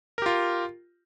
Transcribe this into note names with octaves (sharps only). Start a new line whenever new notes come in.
F4 G4 A#4